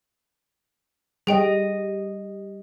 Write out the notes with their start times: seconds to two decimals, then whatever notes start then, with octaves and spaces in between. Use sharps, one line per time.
1.27 G3 G#4 D#5 G5